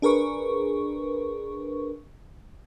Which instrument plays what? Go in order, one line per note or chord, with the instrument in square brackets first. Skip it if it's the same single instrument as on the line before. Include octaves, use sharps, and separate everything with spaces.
[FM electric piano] D4 G#4 A#4 B4 C#6